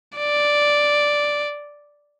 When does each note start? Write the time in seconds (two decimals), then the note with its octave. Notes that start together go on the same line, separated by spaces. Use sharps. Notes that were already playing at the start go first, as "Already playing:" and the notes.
0.18 D5